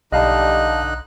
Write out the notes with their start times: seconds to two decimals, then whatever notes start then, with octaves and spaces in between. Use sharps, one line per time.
0.12 B1 D3 G3 D#4 D#5 F5 A5 F#6